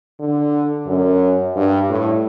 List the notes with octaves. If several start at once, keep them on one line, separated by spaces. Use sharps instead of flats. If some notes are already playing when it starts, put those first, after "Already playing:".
D3
F#2
G2
A2